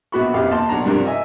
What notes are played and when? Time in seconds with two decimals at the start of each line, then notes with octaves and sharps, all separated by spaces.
0.12 A#1 B3 F#4 B5 C#6
0.34 A#1 F2 B2 B3 G4 F5
0.51 D#2 A5 C6
0.69 B1 D4 A#5
0.85 G2 C3 F3 D4 A#4
1.05 D#5 E5 G#5